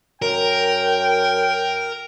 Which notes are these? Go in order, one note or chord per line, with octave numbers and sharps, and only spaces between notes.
F#2 A#4 G5